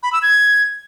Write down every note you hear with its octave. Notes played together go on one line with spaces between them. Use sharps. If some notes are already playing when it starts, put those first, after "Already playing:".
B5
E6
G#6